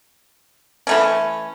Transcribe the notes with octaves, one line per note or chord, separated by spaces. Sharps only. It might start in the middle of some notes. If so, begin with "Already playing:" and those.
E3 A3 C#4